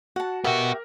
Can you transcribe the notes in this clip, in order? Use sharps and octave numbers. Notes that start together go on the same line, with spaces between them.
F#4 F#5 A5
B3 F#4 G4 A#4 E5 F#5